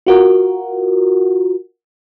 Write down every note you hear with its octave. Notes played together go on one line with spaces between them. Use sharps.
F4 F#4 A#4